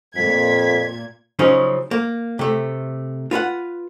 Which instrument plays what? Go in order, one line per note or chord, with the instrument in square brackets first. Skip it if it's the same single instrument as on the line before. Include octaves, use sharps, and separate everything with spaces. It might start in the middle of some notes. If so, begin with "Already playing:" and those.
[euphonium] F2 [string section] A#2 G#6 [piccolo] B6
[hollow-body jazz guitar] C#3 F3 F#3 C#4 D#4
A#3
C3 A3
F4 B4 F5 F#5